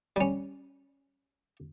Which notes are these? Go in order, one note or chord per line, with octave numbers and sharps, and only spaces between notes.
G3 C#4